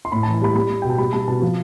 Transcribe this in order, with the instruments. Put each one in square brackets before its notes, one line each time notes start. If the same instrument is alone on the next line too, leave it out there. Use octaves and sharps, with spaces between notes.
[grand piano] C6
A2 B5
A5
E3
A5
G3 B5
G3 B5
G3
B2 G5
A5
G3 B5
G3 A5
B2 A5
F3